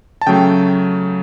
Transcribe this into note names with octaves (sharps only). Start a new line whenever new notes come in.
A5
C#3 F#3 A3 G5